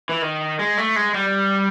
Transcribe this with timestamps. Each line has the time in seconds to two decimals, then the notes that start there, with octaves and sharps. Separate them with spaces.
0.09 E3
0.22 D#3
0.59 G#3
0.78 A3
0.96 G#3
1.14 G3